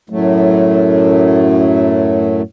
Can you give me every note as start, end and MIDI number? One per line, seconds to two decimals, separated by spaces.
0.10 2.42 42
0.10 2.42 45
0.10 2.42 54
0.10 2.42 57